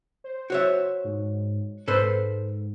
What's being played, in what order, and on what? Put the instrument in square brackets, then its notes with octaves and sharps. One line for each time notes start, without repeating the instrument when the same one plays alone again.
[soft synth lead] C5
[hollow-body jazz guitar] F#4 C#5 E5
[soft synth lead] G#2
[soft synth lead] G#2 [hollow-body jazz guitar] A4 B4 C5